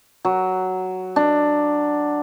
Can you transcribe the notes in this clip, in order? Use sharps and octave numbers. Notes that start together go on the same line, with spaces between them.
F#3
D4